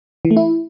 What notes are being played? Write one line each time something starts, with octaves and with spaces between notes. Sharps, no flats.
E3
A3
E4